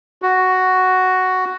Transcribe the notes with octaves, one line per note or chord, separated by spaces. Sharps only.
F#4